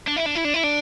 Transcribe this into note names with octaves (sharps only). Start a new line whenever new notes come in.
D4
E4
D4
E4
D4
E4
D4